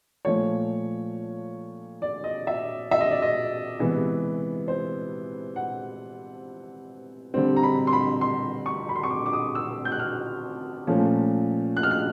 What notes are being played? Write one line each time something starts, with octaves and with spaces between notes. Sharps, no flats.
A#2 F3 A3 C#5
D5
D#5
E5
E5
D#5
D5
D#5
C3 E3 G#3 B3
C5
F#5
D3 G3 C4
A#5
B5
C6
B5
C6
C#6
B5
C6
C#6
D6
D6
D#6
E6
G6
F#6
F6
A#2 F3 A3 C#4
F#6
F6
F#6